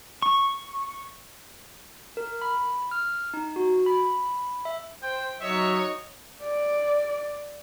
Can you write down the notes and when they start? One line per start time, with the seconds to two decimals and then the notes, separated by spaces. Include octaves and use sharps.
0.22 C#6
2.17 A#4
2.42 B5
2.91 F6
3.34 D#4
3.56 F#4
3.86 B5
4.65 E5
5.03 C5 G5
5.41 F#3 D#4 F#4 C#5 D#5 E5
6.43 D5